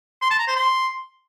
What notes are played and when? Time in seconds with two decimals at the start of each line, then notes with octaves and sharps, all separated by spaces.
0.22 C6
0.30 A5
0.39 A#5
0.47 C5
0.56 C6